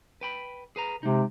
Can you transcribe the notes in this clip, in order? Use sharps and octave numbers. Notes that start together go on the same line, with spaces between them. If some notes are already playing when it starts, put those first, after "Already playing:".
B4 G5 B5
G#4 B4 A#5
C3 G#3 D#4